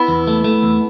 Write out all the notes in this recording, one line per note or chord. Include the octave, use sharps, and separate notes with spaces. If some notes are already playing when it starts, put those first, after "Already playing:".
Already playing: B3 E4
E2
A3
A3
E2